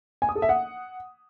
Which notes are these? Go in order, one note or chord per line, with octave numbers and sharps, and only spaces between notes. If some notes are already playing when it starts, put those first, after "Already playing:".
G#5
D#6
A4
E5
F#5